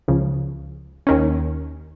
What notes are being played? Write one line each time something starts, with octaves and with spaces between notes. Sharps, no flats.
C#2 C#3 F3
D#2 D#3 C#4